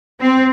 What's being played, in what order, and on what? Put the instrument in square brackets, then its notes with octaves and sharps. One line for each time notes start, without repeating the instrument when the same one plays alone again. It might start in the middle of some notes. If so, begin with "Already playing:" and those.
[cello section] C4